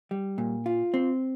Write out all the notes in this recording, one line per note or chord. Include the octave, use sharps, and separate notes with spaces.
G3
A#2
F4
C4